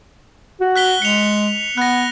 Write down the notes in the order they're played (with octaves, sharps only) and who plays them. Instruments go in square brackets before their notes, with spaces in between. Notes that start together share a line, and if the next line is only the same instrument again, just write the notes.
[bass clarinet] F#4
[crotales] F#6 B6 G7
[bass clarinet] G#3 [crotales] C#7 F7
[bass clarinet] B3 [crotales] F#6 A#6